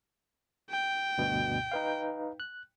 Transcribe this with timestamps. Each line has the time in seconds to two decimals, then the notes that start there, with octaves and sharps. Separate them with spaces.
0.71 G5
1.18 D2 G2 B2
1.72 D#4 B4 F5
2.40 F#6